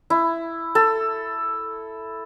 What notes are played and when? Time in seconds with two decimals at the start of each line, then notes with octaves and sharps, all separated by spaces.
0.10 E4
0.75 A4